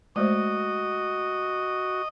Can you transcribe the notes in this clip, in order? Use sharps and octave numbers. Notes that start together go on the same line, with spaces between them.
G#3 A3 F#4 C5 D#5